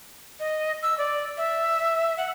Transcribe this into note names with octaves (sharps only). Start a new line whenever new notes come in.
D#5
E6
D5
E5
F#5